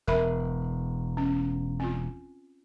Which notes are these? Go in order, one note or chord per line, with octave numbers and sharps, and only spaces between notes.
E1 A#4 E5 B5
C#4
C4 F4